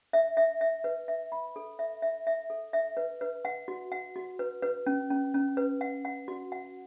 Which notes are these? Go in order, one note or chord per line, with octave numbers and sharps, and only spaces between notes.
E5
E5
E5
B4
E5
B5
A4
E5
E5
E5
A4
E5
B4
B4
F#5
F#4
F#5
F#4
B4
B4
C#4
C#4
C#4
B4
F#5
F#5
F#4
F#5